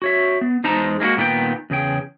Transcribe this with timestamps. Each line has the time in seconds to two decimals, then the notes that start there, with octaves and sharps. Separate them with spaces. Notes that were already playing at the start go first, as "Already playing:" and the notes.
0.02 F#4 C#5 E5
0.41 B3
0.64 E2 G#3 D#4 C5 A5 A#5
1.00 G#3 A#3 D#4 F#4
1.17 A#2 D#3 B3 D4 G5
1.70 E2 C#3 G#4 G5